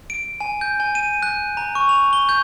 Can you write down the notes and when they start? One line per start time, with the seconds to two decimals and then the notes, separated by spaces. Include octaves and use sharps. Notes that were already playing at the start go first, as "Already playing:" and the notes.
0.10 D7
0.40 G#5
0.61 G6
0.80 G#5
0.95 D#7
1.23 F#6
1.57 A#5
1.75 C#6
1.89 F7
2.13 G7
2.29 G6